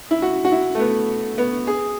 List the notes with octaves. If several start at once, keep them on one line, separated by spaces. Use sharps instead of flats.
E4
F#4
F#4
E4
A3
B3
B3
G#4